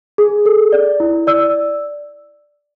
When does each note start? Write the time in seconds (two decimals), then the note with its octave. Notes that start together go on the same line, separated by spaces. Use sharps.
0.18 G#4
0.46 A4
0.72 D5
1.00 E4
1.27 D5 E6